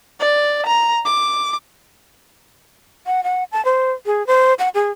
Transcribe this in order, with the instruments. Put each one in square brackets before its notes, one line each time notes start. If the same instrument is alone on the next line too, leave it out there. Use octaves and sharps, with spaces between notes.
[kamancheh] D5
A#5
D6
[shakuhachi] F#5
F#5
A5
C5
G#4
C5
F#5
G#4